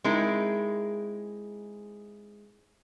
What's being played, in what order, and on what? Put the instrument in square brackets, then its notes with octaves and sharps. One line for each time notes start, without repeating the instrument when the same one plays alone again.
[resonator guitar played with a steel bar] G#3 C4 D#4 E4 G#4 A#4